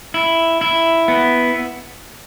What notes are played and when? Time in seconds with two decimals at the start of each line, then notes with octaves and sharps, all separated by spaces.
0.14 E4
0.61 E4
1.08 B3